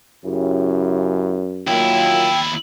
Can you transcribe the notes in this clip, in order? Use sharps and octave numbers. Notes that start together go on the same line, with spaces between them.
F#2 C#3 E4 G4
D#2 F#3 A#3 E4 F4 G5